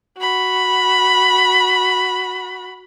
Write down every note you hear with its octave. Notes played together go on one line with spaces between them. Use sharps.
F#4 B5